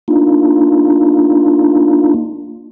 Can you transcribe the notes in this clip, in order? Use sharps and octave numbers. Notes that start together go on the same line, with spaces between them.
A#3 D4 D#4 F4